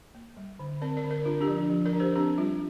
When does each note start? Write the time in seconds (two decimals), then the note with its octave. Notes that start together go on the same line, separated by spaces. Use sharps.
0.15 A#3
0.37 G3
0.59 D3
0.82 C4 A#4 D5
0.97 A#4 D5
1.04 D3
1.11 A#4 D5
1.25 D4 F4 A#4
1.41 D4 G4
1.48 F3
1.56 D4
1.70 F3
1.86 A#4 D5
1.93 D4
2.00 G4 C5
2.15 C4 D4 G4
2.38 G3 F4